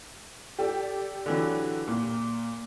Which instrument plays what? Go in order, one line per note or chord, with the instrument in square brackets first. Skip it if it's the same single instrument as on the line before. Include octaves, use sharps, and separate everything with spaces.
[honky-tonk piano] G4 A4 D5
[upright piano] D3 E3 F#3
A#2